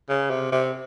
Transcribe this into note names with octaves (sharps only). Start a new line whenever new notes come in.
C#3
C3
C3